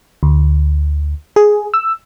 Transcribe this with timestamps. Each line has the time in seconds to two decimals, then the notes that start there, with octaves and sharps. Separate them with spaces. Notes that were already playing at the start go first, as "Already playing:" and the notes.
0.23 D2
1.36 G#4
1.74 E6